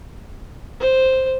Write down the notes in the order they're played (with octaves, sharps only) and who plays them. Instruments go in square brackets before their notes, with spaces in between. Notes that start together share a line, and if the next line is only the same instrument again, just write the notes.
[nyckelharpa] C5